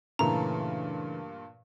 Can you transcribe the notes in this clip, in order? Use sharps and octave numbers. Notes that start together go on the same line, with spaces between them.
G2 A#2 C#3 E3 A3 A#5